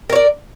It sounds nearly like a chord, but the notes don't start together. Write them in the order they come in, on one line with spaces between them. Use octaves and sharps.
A#4 C#5 D5